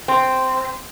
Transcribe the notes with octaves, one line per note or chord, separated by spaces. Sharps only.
C4